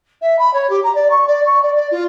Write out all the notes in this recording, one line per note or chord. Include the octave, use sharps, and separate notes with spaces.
E5
B5
C#5
G4
A#5
D5
C#6
D5
C#6
D5
D5
F4